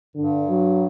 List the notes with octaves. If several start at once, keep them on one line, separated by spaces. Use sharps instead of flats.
G2 D3
F#3